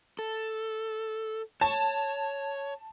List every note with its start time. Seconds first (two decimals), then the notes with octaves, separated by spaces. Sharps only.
0.19 A4
1.61 C#5 A5